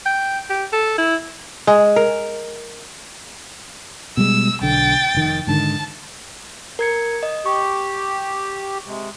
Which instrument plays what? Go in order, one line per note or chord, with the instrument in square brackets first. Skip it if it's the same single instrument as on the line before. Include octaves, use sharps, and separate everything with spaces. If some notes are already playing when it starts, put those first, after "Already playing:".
[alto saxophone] G5
G4
A4
E4
[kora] G#3
A#4
[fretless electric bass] B2 G3 G#3 [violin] E6
[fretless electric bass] B1 D3 [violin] G5 A6
[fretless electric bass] F1 D#3
[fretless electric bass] G#2 D3 D#3 [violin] A5
[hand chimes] A#4 G#6 C#7
D#5
[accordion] G4 [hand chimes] C#6
[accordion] C3 G#3